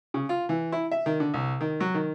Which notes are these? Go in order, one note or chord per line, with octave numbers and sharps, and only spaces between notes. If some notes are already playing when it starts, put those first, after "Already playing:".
C#3
F4
E3
E4
E5
D#3
D3
C2
D#3
F#3
D#3